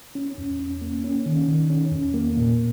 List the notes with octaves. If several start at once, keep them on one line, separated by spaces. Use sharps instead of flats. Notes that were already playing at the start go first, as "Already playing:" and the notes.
C#4
E2
C#4
A#3
C#4
D#3
D#3
C#4
E2
A#3
A#2